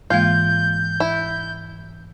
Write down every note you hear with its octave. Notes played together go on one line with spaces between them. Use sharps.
G#2 E3 G#3 A#3 F4 F5 G6 G#6
E4